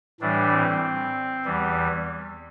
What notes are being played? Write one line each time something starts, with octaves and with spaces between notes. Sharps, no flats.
A2 E3 G3 D4
C4
E2 E3 G3